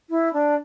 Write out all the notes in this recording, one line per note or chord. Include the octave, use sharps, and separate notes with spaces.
E4
D4